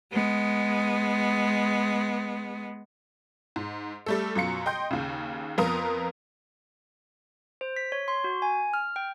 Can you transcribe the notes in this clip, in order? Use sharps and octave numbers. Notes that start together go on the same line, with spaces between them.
G#3 B3
G#2
G3 A3 A4
F#2 B2 F4 C#7
D#5 G5 C6 G6
D#2 C#3
F2 B3 F4 A#4 A#5 D#6
C5
B6
C#5
C6
F#4
G#5
F6
G5